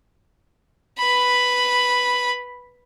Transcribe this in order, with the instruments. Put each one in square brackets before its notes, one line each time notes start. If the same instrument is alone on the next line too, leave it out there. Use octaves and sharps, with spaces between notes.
[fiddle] B4 B5